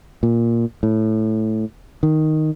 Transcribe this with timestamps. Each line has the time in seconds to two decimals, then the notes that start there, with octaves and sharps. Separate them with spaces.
0.23 A#2
0.83 A2
2.03 D#3